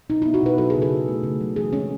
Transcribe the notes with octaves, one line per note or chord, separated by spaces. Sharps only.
B2 D#4
E4
B3
F#4
B2 B4
F#3 A4
C#3 G#4
A4
C#3
A3
C#3
F#3
E3 G#4
G#3 C#4